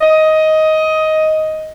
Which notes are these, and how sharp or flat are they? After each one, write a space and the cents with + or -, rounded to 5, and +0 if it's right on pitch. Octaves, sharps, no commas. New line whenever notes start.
D#5 +10